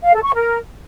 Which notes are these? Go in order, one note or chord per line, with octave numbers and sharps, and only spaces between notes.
F5
A4
C#6
A#4